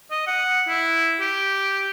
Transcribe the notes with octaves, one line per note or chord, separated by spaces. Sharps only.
D#5
F#5
E4
G4